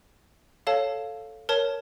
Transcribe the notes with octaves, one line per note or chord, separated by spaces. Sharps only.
A4 C#5 F5 A5
A#4 C#5 A5